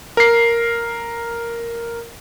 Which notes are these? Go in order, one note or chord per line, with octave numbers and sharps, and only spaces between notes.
A#4 C7